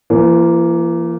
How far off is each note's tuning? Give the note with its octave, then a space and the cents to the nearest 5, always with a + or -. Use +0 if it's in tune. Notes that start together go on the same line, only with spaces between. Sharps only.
E3 +45 A#3 +0